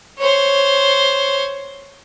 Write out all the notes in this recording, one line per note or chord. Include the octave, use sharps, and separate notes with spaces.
C5 C#5